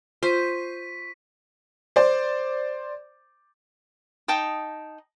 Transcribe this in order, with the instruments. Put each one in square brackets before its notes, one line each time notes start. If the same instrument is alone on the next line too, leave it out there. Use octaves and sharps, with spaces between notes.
[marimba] F4 [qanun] C5 [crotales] C#6 B6 D#7
[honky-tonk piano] C5 D5
[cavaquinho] D#4 G5 A5 D#6